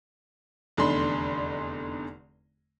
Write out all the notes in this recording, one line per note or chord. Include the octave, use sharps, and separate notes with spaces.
F1 E2 D3 D#4 B5 C6